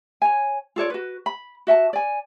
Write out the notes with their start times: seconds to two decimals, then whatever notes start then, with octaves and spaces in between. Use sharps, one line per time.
0.22 C#5 G#5
0.76 F4 A4 C#5 D5
0.90 F#4 B4
1.26 B5
1.67 F#4 E5 G5 A5
1.93 D5 G#5